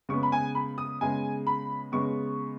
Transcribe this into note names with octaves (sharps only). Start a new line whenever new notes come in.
C#3 G#3 B3 C#6
B5
G#5
B5
D#6
C#3 G#3 B3 G#5
B5
C#3 G#3 B3 C#6